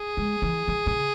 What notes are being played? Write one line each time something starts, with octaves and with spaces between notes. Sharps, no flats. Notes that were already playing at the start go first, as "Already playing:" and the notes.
Already playing: G#4
G#3
E3
D#3
C#3